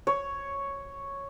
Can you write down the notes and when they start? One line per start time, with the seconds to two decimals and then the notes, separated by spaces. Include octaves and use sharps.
0.07 C#5